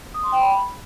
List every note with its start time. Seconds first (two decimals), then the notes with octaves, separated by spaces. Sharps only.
0.14 D#6
0.23 C6
0.32 G5
0.41 B5